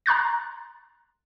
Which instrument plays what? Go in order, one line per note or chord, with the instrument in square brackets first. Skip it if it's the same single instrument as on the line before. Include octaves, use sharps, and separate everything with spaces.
[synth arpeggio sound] A#5 C6 F#6 A6